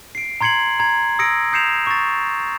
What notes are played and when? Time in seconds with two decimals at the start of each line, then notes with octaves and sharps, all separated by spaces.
0.15 C7 D7
0.41 A#5 C6 G#6 C7 C#7 F#7
0.80 A#5 G#6
1.19 D#6 E6 A#6 C#7 D7
1.53 D#6 G6 C7 C#7 E7 F7
1.87 C#6 A6